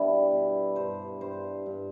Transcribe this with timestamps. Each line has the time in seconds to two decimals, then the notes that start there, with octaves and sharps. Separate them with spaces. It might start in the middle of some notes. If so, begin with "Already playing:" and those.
Already playing: B2 G3 D4 E4
0.31 B2
0.76 G2 C5
1.21 G2 C5
1.66 G2